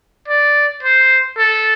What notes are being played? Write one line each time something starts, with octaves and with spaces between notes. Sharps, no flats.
D5
C5
A4